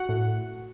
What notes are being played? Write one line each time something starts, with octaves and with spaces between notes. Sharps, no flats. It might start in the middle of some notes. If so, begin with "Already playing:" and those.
Already playing: F#4 F#5
A2